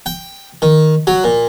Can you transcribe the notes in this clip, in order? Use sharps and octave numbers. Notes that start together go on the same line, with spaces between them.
G5
D#3
F#3
A#2